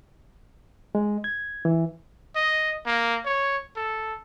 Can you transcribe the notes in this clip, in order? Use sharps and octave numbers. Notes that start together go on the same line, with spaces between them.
G#3
G#6
E3
D#5
A#3
C#5
A4